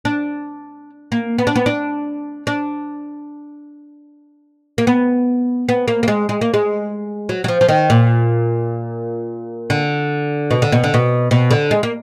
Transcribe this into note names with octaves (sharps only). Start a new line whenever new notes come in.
D4
A#3
B3
D4
B3
D4
D4
A#3
B3
B3
A#3
A#3
G#3
G#3
A#3
G#3
F#3
F#3
F3
F3
D#3
A#2
D3
B2
D3
B2
D3
B2
B2
D3
G#3
A#3